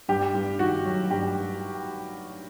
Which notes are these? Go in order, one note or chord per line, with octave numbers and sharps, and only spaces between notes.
G2 G4
G2
D#3 F#4
F#3
G2 G4